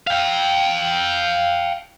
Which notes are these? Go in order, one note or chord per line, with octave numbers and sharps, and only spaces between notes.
F5 G5